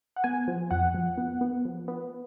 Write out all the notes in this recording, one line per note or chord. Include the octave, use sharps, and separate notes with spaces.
F#5
B3 G#5
F3
F2 F#5
F3
B3
B3
F3
B3